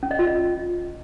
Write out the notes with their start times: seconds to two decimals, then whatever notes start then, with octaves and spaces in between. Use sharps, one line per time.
0.03 C#4
0.11 D#5
0.19 F4
0.27 D#5